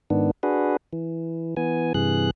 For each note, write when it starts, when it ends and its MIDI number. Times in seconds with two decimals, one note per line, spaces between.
0.10 0.31 44
0.10 0.31 51
0.10 0.31 59
0.10 0.31 62
0.43 0.76 62
0.43 0.76 66
0.43 0.76 68
0.43 0.76 71
0.93 1.55 52
1.57 1.93 52
1.57 1.93 59
1.57 1.93 80
1.94 2.30 43
1.94 2.30 48
1.94 2.30 52
1.94 2.30 68
1.94 2.30 90